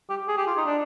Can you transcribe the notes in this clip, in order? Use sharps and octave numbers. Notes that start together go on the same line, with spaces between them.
G4
G#4
G4
F4
D#4
D4